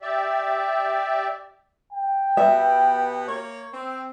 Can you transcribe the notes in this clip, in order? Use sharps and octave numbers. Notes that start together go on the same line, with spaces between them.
G4 D5 E5
G5
B2 B3 G4 E5
A#3 C#5
C4